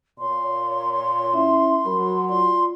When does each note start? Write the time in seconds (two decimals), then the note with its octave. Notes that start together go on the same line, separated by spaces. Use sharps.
0.19 A#2 C#5 C6
1.33 C#4 E4 E5
1.85 F#3 A#4 B5
2.29 F4 D5 C6